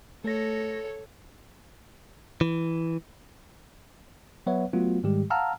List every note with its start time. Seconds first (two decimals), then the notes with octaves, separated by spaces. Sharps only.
0.24 A3 A4 C#5 A#6
2.41 E3
4.46 F#3 B3 B4 C#5 E5 F#5
4.73 F#3 A3 B3 F4 F#4
5.03 G#2 D#3 G3 G#3 G4
5.30 F5 F#5 A5 A#5 E6 F6